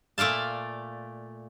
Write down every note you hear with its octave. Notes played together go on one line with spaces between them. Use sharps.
A#2 A3 D5 F5 A5